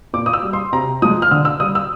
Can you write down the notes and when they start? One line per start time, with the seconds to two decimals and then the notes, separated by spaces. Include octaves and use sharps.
0.13 A#2 D6
0.26 D#6
0.33 E6
0.43 G3
0.53 C6
0.73 C3 A#5
1.02 F3 G#3 D#6
1.22 F6
1.31 D3 E6
1.45 E6
1.60 G3 D#6
1.75 E6